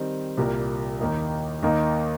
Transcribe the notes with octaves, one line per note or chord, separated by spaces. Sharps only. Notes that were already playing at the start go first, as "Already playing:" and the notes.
Already playing: D#3 G3 C4
C2 A#2 A#3 G4 A#4
D#2 D#3 A#3 D#4
D#2 D#3 A#3 D#4